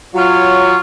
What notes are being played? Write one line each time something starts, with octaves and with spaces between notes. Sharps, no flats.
F#3 F4 C#5